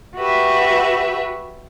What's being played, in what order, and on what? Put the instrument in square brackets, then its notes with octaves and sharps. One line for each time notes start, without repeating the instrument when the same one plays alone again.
[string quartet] F#4 G4 B4 E5